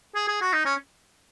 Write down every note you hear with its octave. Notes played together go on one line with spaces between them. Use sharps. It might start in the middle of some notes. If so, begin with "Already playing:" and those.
G#4
G#4
F#4
D#4
C#4